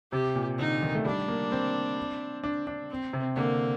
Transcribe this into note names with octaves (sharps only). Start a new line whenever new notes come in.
C3 G4
A#2
D3 D#4
D#3
A3
G3 D4
A#3
C4
D4
D4
C4
C3
D3 A#3